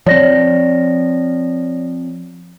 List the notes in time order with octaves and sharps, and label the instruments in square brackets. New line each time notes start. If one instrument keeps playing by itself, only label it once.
[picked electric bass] F3 C4 [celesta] C#5 D5 A#6